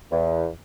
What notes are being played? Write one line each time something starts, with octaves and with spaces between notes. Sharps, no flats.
E2